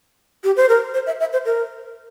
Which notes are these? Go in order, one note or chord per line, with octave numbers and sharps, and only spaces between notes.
G4
C5
A#4
C5
E5
E5
C5
A#4